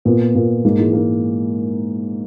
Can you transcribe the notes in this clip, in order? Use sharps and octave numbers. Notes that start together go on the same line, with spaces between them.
A#2 B3
A#2
G#2 A#3
E3 G#3
A#3